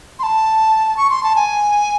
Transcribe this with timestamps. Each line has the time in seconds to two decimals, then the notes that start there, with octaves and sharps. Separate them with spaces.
0.19 C6
0.23 A5
0.97 C#6
1.10 C6
1.23 A5
1.36 G#5